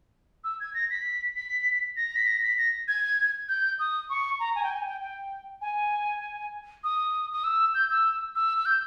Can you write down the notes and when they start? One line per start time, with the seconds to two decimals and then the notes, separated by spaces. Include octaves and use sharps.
0.44 E6
0.60 G#6
0.74 A#6
0.90 B6
1.36 B6
1.96 A#6
2.16 B6
2.27 A#6
2.43 B6
2.57 A#6
2.88 G#6
3.48 G6
3.79 D#6
4.09 C#6
4.40 A#5
4.55 G#5
4.63 G5
4.70 G#5
4.86 G5
5.01 G5
5.61 G#5
6.84 D#6
7.33 D#6
7.44 E6
7.74 G6
7.90 E6
8.35 E6
8.57 E6
8.65 G6